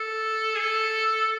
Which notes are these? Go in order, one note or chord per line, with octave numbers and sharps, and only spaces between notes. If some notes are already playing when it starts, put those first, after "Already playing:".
Already playing: A4
G#4
A4